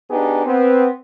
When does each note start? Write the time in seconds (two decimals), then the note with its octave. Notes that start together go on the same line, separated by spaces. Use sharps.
0.11 B3 D4 D#4 G4 G#4
0.46 B3 C4